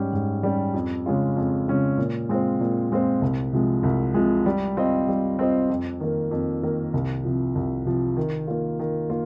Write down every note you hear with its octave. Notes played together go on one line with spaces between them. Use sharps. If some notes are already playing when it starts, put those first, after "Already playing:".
Already playing: G#2 G3 C#4 G4
G#2
G3 C#4 G4
F2
C#3 G#3 C#4 F4
F2
C#3 G#3 C#4 F4
A#2
G#3 C4 F4 C5
A#2
G#3 C4 F4 C5
C2
C3 F3 G#3
C2
C3 F3 G#3
G3
C4 F4 C5 D#5
G3
C4 F4 C5 D#5
F2
D#3 A#3
F2
D#3 A#3
C2
C3 F3
C2
C3 F3
D#3
A#3 F4
D#3
A#3 F4